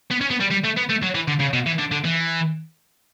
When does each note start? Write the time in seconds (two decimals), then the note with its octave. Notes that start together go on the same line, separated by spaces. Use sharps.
0.11 B3
0.21 C#4
0.30 B3
0.40 G3
0.51 G3
0.64 A3
0.77 B3
0.89 A3
1.03 F#3
1.15 E3
1.28 D3
1.40 C#3
1.53 B2
1.67 E3
1.79 D3
1.92 D3
2.05 E3